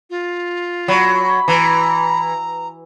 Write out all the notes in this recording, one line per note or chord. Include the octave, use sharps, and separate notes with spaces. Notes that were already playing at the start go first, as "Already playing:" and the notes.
F4
F#3 B5
E3 A#5